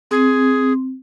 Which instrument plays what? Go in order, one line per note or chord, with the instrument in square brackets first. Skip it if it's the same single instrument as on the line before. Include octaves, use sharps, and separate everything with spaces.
[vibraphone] C4 [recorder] G#4